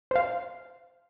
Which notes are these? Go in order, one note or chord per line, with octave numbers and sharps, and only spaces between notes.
C5 F5